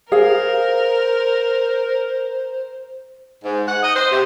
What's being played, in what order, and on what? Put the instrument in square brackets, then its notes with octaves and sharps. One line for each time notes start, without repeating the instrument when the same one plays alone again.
[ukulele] G#4 F5 [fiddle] A#4 [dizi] C5
[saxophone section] G#2
F#5
D#5
C5
C3